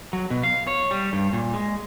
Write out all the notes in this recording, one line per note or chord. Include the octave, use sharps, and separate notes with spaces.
F#3
B2
F5
C#5
G3
G2
A#2
G#3